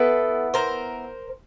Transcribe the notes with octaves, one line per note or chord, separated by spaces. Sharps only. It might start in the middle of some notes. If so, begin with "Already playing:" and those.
Already playing: B3 E4 A4 B4
A#4 C5